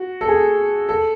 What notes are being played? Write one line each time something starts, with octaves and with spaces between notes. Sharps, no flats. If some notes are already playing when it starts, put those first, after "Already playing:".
Already playing: F#4
A4
G#4
A4